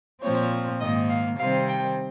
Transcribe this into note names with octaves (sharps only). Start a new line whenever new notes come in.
A#2 F3 C4 C#5
G#2 D#3 A#3 D#5
F5
C3 D#3 G3 C4 F5
G5